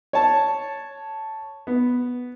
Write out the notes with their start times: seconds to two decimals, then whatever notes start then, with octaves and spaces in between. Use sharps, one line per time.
0.13 C#5 A5
1.67 B3